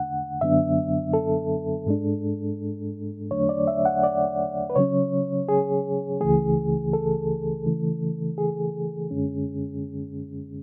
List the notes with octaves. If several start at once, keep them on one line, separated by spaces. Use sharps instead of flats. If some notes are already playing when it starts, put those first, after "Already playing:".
Already playing: E2 D3 A3 D4 F#5
F#2 D3 F#3 B3 D4 E5
A4
G#2 G#3 D4
E2 D3 F#3 A3 D4 C#5
D5
E5
F#5
D5
B4
C#3 F#3 C#4 C#5
G#4
C#2 C#3 E3 A3 G#4
A4
C#3 E3 A3
G#4
F#2 D3 G#3 C#4